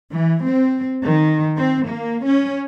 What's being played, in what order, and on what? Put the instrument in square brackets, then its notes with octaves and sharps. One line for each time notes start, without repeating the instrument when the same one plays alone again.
[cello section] E3
C4
D#3
C4
A#3
C#4